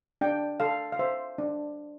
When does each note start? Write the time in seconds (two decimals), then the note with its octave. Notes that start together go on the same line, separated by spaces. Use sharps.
0.21 D4 G5
0.60 A4 F5
0.92 F5
0.99 C5 E5
1.38 D4